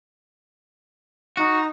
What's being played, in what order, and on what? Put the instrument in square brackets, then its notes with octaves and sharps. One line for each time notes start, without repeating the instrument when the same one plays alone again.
[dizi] D#4 [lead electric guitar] F#4